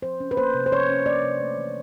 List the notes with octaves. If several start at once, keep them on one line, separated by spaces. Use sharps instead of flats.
F3 C5
C#4
B4
A#3 C5
C3
C5
F3 C#5
C#4
A#3 D5
C3
A3
E3